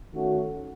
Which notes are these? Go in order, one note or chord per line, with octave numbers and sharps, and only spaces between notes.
D#3 A3 C#4 F#4